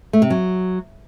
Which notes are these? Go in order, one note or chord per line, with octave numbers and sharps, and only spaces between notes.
A3
C3
F#3